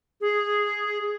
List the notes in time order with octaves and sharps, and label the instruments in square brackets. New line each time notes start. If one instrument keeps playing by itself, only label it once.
[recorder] G#4